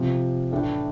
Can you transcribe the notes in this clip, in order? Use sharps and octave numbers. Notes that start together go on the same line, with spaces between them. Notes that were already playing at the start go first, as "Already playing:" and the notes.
Already playing: C3 F3 C4
A2 E3 A3 D4